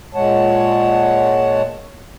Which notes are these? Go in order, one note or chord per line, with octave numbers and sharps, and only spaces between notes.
A#2 G#3 C#5 F#5 A5